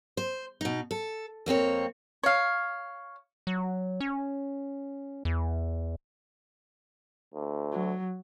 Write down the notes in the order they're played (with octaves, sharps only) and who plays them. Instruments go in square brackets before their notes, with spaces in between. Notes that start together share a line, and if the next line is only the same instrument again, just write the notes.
[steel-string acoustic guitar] C5
B2 D#4
A4
F2 A#3 C4 C#5
[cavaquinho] C#5 F5
[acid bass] F#3
C#4
E2
[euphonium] D2
[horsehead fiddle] F#3